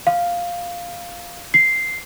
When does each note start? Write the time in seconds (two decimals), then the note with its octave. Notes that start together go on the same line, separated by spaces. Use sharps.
0.07 F5
1.54 C7